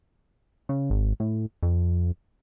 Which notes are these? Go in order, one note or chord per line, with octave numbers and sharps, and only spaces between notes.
C#3
G#1
A2
F2